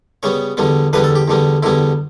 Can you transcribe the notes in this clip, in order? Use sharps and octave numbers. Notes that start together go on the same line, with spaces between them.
C#3 G3 B3 C#5
E2 D3 G3 B3
E2 D3 G3 B3 B4
A4
G4
E2 D3 G3 B3
E2 D3 G3 B3 E4